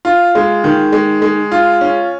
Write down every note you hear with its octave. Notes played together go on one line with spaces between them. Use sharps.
F4
G#3
D#3
G#3
G#3
F4
C#4